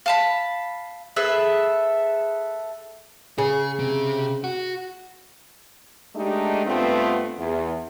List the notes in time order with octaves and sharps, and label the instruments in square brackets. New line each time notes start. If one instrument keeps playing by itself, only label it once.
[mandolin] F5 A5 B5
G#4 A4 B4 E5
[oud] C#3 [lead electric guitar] G#4
[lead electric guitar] C3
F#4
[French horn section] G#3 A3 D4 D#4 G4
G2 A3 B3 C4 F4
E2